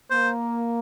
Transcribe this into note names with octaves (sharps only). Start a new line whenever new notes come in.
A#3 C5